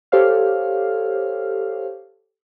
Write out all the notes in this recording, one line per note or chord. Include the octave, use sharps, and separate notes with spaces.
G4 A4 C5 C#5 F5 F6